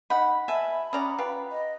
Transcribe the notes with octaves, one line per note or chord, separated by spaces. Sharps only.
D#4 F#5 B5
B2 E5 G#5 A5 B5
C#4 D5 F#5 A#5 D#6
F4 G4 B4
D#5